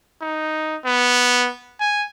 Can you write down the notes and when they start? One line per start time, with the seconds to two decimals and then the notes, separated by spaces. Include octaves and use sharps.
0.21 D#4
0.85 B3
1.80 G#5